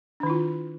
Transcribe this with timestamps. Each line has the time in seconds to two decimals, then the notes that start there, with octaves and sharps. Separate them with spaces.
0.20 D4
0.23 D#3
0.27 E4
0.30 F4